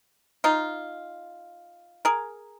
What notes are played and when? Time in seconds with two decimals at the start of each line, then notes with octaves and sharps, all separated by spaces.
0.44 D#4 F4
2.05 G#4 A#4